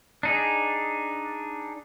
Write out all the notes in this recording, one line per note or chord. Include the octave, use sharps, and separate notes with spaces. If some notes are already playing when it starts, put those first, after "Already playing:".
D4 D#4 G#4